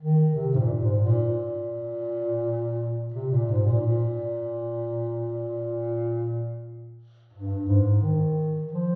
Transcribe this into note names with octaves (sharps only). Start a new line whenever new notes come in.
D#3
C3
G#2
A#2
G#2
A#2
C3
A#2
G#2
A#2
A#2
G2
G#2
D#3
F3